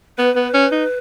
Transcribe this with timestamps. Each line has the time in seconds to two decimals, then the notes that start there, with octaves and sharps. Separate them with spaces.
0.18 B3 B4
0.36 B3
0.54 C#4
0.72 D#4